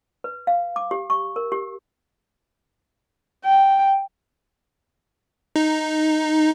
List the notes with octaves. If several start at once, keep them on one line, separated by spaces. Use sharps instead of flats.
B4
F5
D6
G4
C#6
A#4
G4
G5
D#4